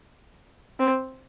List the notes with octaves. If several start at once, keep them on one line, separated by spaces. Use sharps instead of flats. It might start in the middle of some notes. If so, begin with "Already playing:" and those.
C4